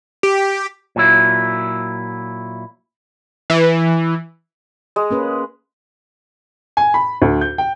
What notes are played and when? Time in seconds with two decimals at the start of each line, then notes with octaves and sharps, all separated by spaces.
0.23 G4
0.96 A#2 F#3 E4
3.50 E3
4.96 G#3
5.11 A#3 C#4 B4
6.77 G#5
6.94 B5
7.22 D2
7.41 G6
7.58 G5